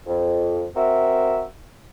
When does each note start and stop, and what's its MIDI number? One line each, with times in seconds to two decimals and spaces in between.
0.07 0.66 41
0.76 1.45 60
0.76 1.45 66
0.76 1.45 70
0.76 1.45 76